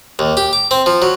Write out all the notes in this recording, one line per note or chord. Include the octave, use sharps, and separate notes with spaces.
D#2
G4
D6
C4
F3
F#3